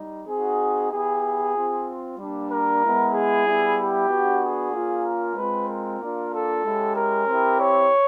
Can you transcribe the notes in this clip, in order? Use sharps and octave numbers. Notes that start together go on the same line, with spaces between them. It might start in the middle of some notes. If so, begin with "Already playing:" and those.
Already playing: G3 D#4
C4 D#4 F#4 G#4
B3 E4 G4 G#4
C4 F4
G3 A#3 D4
A#4
G#3 B3 E4
G#4
G3 B3 E4
G4
B3 D4 F#4
G#4
A#3 C#4 F4
A#4
G#3 C4 F4 B4
A#4
A#3 D4 F4
A4
G#3 C#4 E4 G4
A#4
C4 E4 G4
C#5